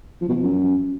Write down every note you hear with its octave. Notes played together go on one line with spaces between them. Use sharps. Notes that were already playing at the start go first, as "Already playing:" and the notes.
F3
B2
F3
F#2